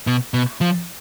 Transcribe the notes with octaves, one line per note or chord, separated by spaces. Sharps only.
B2
B2
F3